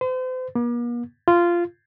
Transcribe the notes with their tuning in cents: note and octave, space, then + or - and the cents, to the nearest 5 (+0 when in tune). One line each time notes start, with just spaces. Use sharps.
C5 -40
A#3 +45
F4 -15